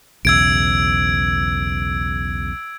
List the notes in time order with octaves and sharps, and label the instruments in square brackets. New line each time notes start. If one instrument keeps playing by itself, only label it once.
[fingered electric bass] B1 E2 C#3 [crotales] E6 G#6 D7